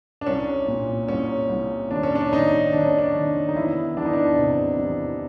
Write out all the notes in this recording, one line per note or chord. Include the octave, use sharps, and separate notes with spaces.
D4
C2 C#4
A#2
C2 C#4
C2
D#2 D4
C#4
D4
D#3 D#4
D#3 D4
C#4
D4
D#3
D#4
E2 E4
E2 D4
D#4
D4
C3
E3